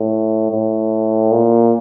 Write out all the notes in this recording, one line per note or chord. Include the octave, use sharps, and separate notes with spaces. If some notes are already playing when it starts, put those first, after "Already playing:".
Already playing: A2
A2
A#2